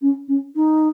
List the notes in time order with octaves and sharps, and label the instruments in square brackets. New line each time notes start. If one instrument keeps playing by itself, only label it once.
[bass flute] C#4
C#4
D#4